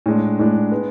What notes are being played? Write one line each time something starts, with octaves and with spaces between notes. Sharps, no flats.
A2 G#3 D4
A2 G#3 D4
G#3 B3